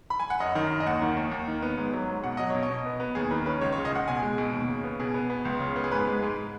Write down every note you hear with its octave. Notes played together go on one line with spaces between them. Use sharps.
B5
G#5
F#5
F#2 D#5
D#3
F#2
D#5
D#2 F#5
D#3
D#2
D#2
D#3
B3
G#2
F#3
G#2
B2 F#5
F#3 D#5
B2 C#5
D#5
B2
B3
B3
D#2 G#4
D#3 B4
C#4 B4
C#2 C#5
C#5
C#3
D#5
C#2 F#5
B2 G#5
G#3
B2
D#2
C#3
B3
B2 G#4
B3
B3
C#2
C#3
B3
G#4
G#2 B4
G#3
G#2